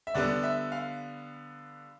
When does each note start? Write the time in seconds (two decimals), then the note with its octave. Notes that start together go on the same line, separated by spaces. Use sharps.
0.07 E5
0.15 D3 G3 B3 D5
0.43 E5
0.72 F5